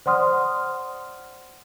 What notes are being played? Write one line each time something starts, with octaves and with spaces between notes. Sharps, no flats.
C5 D5 F#5 C6 D#6 F6